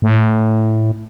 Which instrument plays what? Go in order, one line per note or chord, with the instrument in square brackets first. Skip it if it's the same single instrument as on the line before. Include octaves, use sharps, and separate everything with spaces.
[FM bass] A2